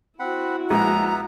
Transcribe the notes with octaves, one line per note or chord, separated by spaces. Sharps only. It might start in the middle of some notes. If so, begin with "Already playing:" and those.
C4 E4 F#4 F#5 B5
A#1 G#3 B3 F4 E5 F#5 A#5